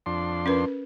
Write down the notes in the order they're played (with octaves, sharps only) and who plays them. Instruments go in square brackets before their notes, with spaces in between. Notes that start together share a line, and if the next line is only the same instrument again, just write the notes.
[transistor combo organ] F2 D4 C6
[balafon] C#4 A#4 B4